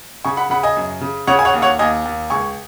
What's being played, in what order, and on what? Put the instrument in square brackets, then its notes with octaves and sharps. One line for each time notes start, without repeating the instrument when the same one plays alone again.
[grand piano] C#3 G#5 C#6
F#5 B5
C#3 F#5 B5
D#5 G#5
F#2
C#3
C#3 C#5 F#5
G#5
C#5 F#5
D#2
C#5 F#5
D#2 D#5 G#5
D#2
C#2 G#5 C#6